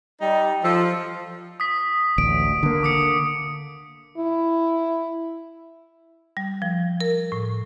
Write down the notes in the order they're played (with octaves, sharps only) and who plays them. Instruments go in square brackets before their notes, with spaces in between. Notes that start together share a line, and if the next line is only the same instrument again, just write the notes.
[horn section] G3 D#4
[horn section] F3 [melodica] A4
[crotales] D#6 B6
[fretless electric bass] A1 D2 [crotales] D7
[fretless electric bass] D3 A#3
[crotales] D6 D#6 C#7
[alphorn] E4
[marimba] G3
F3
A#4
A2